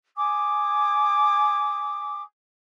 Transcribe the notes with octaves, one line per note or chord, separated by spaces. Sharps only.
G#5 D6 D#6